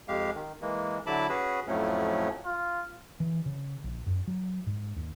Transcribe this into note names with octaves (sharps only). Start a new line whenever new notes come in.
F2 G#3 G4 F5
D#3
E3 G#3 A#3
D3 F#3 E4 A5 B5 D6
C#4 F#4 G#4 B4
F2 A2 F3 F#3 A3 C#4
F4
E3
C#3
A#1
F#2
F#3
G#2
D#2